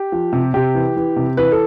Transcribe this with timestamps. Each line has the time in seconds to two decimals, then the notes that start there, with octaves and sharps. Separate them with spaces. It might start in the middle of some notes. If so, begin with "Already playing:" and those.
Already playing: G4
0.12 F3
0.33 C3
0.54 C3 G4
0.75 E3
0.96 E3
1.16 C3
1.37 E3 B4
1.52 A4